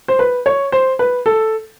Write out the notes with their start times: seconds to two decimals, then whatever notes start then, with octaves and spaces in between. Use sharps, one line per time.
0.08 C5
0.19 B4
0.46 C#5
0.72 C5
0.99 B4
1.26 A4